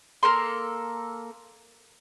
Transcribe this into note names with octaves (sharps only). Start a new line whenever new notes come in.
A#3 A4 A#4 C6